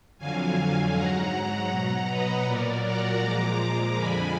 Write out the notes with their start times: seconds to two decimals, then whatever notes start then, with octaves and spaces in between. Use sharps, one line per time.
0.18 F2 D3 F#3 F5 G#5
0.94 G#2 F#3 F#5 A#5
1.70 B2 F#3 F#5 A#5
2.08 B4 D#5
2.45 A#2 F#3 A#4 D5
2.84 F#5 A#5
3.21 A#2 F3 G#3 A#5 D6
3.97 F2 D3 F3 G#3 G#5 B5